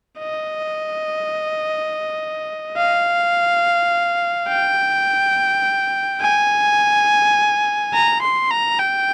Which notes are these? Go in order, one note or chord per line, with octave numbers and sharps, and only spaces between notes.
D#5
F5
G5
G#5
A#5
C6
A#5
G5